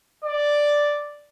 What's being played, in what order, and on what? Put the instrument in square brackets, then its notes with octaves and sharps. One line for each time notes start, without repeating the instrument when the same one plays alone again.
[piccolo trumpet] D5